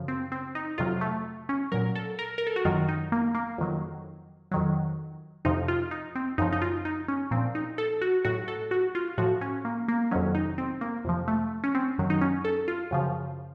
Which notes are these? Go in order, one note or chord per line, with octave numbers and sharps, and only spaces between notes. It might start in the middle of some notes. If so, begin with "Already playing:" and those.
Already playing: F#2 C#3 F3
C4
C4
D#4
F2 C3 F#3 F4
A3
C#4
A#2 F#3 A#4
A4
A#4
A#4
A4
F#4
F#2 D#3 F#3 F4
D#4
A#3
A#3
F2 D#3 F#3
F2 D#3 F#3
F2 C3 F3 D#4
F4
D#4
C4
F#2 C#3 F3 D#4
D#4
F4
D#4
C#4
A#2 F3 C4
D#4
A4
F#4
A2 F#3 F#4
A4
F#4
F4
A2 F3 F#4
C#4
A#3
A#3
F2 C3 D#3 F#3 C#4
D#4
C4
A#3
F2 C3 F3
A3
C#4
C4
F#2 D#3 F#3
D#4
C#4
A4
F4
F#2 C#3 F3